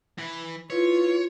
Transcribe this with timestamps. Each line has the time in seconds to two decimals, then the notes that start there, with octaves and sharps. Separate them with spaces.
0.18 E3 B4
0.70 E4 F4 B4 C#5